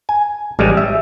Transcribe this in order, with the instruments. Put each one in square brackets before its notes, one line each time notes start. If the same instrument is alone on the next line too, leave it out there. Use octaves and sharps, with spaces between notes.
[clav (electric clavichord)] G#5
A1 G3 G#3
E5